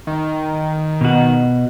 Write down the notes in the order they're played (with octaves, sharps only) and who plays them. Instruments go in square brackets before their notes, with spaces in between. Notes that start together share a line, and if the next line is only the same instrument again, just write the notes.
[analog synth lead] D#3
[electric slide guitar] B2 F#4